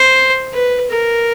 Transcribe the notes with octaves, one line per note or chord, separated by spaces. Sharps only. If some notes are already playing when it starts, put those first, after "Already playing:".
Already playing: C5
B4
A#4